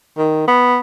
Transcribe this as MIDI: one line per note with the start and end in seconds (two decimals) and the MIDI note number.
0.18 0.46 51
0.48 0.80 59